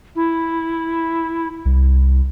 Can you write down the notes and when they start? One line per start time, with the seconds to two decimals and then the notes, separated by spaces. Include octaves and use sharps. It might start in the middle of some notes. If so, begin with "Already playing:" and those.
0.16 E4
1.65 C2